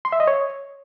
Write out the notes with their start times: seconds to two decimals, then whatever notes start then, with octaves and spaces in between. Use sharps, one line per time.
0.05 C6
0.12 E5
0.20 D#5
0.28 C#5